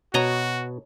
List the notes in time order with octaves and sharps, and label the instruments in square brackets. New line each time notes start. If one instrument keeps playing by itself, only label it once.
[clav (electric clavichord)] B2 [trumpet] F#4 [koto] C#5 D#5 A#5